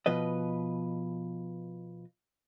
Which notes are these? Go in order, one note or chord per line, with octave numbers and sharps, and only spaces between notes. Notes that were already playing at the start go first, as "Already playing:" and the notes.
B2 F3 B4 D#5